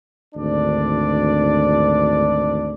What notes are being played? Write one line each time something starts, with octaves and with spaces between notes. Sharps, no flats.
G#1 D2 D4 D5